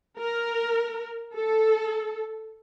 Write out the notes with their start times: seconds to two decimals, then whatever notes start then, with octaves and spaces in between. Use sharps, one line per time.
0.19 A#4
1.35 A4